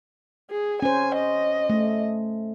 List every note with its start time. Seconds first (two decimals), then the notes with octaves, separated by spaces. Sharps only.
0.50 G#4
0.82 C#4 C5 G#5
1.15 D#5
1.70 A3